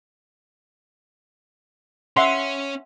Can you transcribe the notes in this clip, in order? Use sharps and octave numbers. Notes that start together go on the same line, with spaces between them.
C#4 E5 F#5 C6